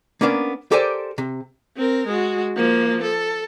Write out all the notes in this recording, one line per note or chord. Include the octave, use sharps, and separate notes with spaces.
A#3 B3 C#4 D4 A#4
G4 A4 A#4 C5 D5 G#5
C3
C4 A#4
G#3 F#4
F3 A#3
A4